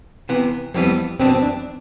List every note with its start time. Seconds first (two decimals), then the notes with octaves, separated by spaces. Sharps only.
0.29 C3 E3 B3
0.74 F2 E3 G3 B3 C4
1.20 E2 B2 B3 C4 D4
1.35 C4
1.42 D4